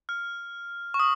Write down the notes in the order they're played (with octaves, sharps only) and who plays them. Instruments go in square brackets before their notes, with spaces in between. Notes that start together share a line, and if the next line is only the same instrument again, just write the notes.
[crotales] F6
C#6
D#6